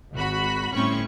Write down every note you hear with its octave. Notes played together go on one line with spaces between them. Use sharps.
G#1 F#4 B5
G1 A2 C4 C#4 B5 C#6